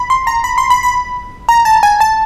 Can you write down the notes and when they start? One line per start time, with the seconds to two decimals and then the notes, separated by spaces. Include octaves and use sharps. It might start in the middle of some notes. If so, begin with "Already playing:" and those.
Already playing: B5
0.10 C6
0.27 A#5
0.44 B5
0.58 C6
0.70 B5
0.83 B5
1.49 A#5
1.65 A5
1.83 G#5
2.00 A5